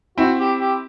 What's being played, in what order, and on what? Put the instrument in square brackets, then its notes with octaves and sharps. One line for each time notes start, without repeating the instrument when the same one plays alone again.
[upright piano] C4 E4 [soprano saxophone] F#4
[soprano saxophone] G4
G4